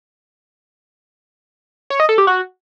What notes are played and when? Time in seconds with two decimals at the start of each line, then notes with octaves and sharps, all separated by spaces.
1.90 C#5
2.00 D#5
2.09 A4
2.18 G4
2.27 F#4